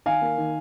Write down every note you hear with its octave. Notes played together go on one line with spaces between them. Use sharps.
D#3 F5 G#5
A#3
D#3